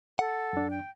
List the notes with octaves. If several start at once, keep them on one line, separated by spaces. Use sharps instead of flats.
A4 F#5
F#2 D4
G5